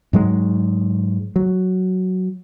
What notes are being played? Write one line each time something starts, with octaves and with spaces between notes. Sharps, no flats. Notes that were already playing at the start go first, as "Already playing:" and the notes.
G#2 F#3 G#3
F#3